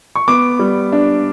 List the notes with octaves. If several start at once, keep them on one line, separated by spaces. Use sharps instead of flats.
C#6
B3 D6
G3
D4